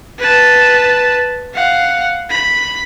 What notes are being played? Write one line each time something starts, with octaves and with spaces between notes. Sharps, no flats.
B4 A5
F5 F#5
B5